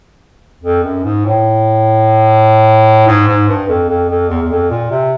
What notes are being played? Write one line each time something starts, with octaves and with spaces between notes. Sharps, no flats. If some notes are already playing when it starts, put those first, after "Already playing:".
F2
F#2
G#2
A2
G#2
G#2
G2
F2
F2
F2
E2
E2
F2
A#2
C3